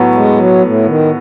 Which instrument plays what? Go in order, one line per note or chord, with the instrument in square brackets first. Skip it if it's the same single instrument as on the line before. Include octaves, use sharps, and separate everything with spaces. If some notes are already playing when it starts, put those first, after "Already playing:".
Already playing: [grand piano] A2 F#3 B3
[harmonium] G#3
F#3
A2
D#3